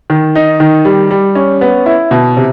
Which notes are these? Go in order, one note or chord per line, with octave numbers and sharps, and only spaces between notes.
D#3
D#4
D#3
G3
G3
C#4
B3
E4
B2
C3